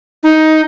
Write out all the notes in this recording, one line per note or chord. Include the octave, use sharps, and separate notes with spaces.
D#4